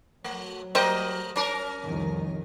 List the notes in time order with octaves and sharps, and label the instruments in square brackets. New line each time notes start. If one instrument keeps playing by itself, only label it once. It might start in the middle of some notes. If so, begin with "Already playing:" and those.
[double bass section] F#3 [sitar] A3
[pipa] G3 C5 [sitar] A3 A#4 D#5
[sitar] C#4 A#4
[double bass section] C2 F2 D#3